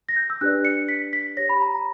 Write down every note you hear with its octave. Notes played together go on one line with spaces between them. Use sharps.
A#6
G6
E6
D4 G4 B4 D5 F#6
C#7
B6
B6
G4 C#5 A#6
B5
A#5
A#5